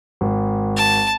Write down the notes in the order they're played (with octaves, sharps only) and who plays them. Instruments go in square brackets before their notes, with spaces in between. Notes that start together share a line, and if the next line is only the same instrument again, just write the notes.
[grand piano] G#1
[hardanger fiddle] A5